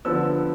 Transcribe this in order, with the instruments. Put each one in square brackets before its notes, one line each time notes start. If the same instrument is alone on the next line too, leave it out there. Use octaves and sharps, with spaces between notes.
[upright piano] D3 F3 B3 E6